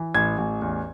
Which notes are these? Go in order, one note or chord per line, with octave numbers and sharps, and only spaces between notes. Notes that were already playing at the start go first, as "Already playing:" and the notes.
Already playing: E3
A1 G#6
A1
E2